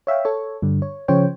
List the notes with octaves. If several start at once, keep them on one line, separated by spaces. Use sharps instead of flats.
C#5 E5 F5 G5
A4 C#5
G2 D3
C#5
C#3 F3 C5 C#5 G5